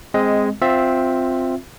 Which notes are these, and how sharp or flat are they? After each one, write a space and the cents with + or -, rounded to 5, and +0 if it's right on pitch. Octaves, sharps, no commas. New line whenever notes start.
G#3 -5 C4 +0 D#5 +10
C4 +0 F4 +15 E5 +0